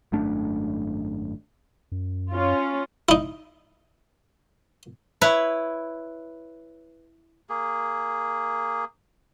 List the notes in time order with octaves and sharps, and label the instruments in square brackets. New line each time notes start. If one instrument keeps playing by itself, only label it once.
[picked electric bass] G#1 F#2 A3 D4
[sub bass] F#2
[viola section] C#4 F4
[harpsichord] D#4 E4
[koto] E4 B4 C#5
[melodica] A#3 G#4